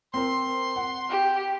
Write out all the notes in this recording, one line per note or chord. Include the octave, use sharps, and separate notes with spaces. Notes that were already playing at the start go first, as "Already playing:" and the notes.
C4 A#4 C5 C6
F#5
G4